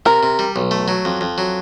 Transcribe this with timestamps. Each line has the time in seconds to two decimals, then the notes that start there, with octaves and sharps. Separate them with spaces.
0.06 C3 A#4
0.23 C3
0.39 G3
0.56 B1
0.71 A3
0.88 F#3
1.05 F2
1.21 F2
1.38 F#3